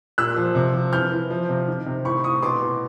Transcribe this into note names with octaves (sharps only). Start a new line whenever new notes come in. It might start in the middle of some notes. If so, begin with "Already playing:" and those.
A#2 E6 F#6
F3
C3
F3
E3 F6 G6
E3
F3
C3
D#3
C3
A2 B5 C#6
A2 C#6 D#6
B2 C6 D6
B2